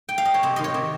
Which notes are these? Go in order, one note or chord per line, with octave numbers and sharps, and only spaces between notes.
G5
F5
D#5
C#5
C3 C5
D#3 D#5
C#5
C3